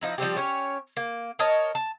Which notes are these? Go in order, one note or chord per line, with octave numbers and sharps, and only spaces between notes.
F3 D#4 E4
F3 G3 C4 G4
C#4 G4 C#5
A#3
A#4 C#5 D#5 A5
A5